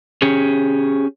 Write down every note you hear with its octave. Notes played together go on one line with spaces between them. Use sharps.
C#4 G4 G#4